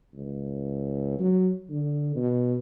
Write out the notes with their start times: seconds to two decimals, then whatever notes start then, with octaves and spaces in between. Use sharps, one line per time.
0.14 C#2
1.19 F#3
1.70 D3
2.15 B2